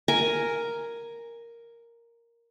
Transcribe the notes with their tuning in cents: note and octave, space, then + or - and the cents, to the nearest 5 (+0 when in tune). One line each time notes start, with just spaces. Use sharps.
A#4 +0 G#5 +0